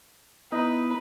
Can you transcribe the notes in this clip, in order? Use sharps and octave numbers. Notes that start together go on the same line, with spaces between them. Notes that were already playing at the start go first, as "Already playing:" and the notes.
B3 D#4 E4 B4